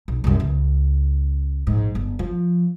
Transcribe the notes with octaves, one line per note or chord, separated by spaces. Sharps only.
B1
C2 F#2
C#2
A#1 G#2
G1
F3